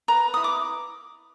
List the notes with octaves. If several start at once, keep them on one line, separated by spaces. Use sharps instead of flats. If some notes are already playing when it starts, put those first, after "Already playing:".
B4 A#5
E4 D#6
D6